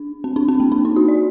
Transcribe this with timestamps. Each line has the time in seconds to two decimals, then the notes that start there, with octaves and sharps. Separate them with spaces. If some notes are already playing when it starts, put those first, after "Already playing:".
Already playing: D4
0.24 C4
0.36 D4
0.48 C4
0.60 A#3
0.72 D4
0.85 D#4
0.96 F#4
1.08 D5